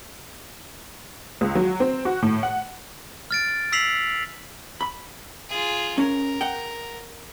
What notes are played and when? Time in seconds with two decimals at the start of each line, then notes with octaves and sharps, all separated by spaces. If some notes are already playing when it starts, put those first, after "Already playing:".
1.41 C#2
1.55 F#3
1.80 C4
2.05 F#4
2.22 A2
2.43 F#5
3.31 F6 A6 D7
3.72 E6 B6 C7 F7 F#7
4.81 B5
5.49 F4 G#4
5.98 C#4 A#4
6.41 F#5 G5